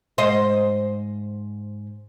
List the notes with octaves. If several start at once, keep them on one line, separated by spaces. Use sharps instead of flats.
G#2 C5 D#5